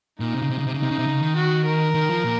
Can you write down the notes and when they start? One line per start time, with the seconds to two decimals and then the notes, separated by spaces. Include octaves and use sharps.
0.20 A#2 D#4
0.34 C3
0.42 C#3
0.50 C3
0.58 C#3
0.67 C3
0.74 C#3
0.78 C3 D#4
0.91 C#3
0.99 C3
1.07 C#3
1.22 D#3
1.36 F#4
1.65 A#4
1.95 D#3
2.09 F3
2.24 A#2